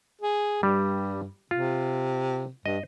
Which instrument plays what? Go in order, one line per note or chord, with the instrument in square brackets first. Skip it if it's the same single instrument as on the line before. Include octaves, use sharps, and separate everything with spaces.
[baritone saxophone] G#4
[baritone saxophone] G2 [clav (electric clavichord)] G3
[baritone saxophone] C3 [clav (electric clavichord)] F4
[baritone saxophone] G2 [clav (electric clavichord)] D#5